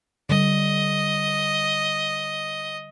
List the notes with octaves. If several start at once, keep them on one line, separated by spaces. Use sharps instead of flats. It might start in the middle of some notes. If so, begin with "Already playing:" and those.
D3 G3 D#5